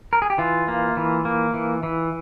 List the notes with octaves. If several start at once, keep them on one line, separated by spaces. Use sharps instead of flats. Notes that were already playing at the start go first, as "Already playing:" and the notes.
A#4
G#4
G4
E3 F4
A#3
E3
A#3
E3
E3